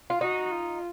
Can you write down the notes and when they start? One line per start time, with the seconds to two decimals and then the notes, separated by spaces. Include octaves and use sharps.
0.10 F4
0.21 D#4 F#4
0.51 F4